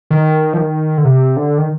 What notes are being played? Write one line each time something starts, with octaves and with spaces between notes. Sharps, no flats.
D#3
F3
D#3
D3
C3
D3
D#3